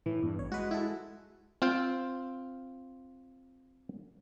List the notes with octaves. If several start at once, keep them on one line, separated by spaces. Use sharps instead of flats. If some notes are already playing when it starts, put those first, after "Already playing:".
A2 E3
E2 G2
A1 C#5
G#3 F#4 B4
E4 F#4 A4
C4 F4 F5 G5